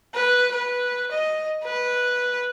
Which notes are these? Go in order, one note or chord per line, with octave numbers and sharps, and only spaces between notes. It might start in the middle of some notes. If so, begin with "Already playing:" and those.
B4
B4
D#5
B4